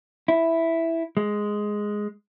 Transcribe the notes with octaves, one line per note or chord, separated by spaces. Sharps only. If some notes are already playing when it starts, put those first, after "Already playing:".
E4
G#3